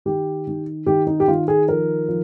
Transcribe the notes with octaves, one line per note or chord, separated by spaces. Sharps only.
D#3 G4
D#3
D#3 G4
D#4
G4
D#3 F4
G#4
F3 A#4
F3